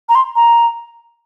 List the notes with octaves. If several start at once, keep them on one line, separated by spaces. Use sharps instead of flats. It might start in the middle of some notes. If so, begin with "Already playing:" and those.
A#5
C6
A#5